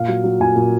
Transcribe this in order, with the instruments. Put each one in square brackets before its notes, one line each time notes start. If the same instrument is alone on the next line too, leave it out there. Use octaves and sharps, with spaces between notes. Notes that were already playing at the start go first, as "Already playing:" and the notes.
Already playing: [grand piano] A#2 F5
F#3
F#3
A#2 G#5
A#2